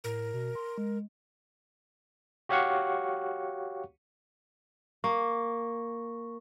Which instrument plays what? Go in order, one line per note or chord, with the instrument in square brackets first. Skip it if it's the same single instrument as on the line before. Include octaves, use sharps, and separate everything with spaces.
[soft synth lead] A2 [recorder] A#4
[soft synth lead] B2
C6
G#3
[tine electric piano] F#4 G4 C#5 F5 F#5 C#6
[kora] A#3 [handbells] C#6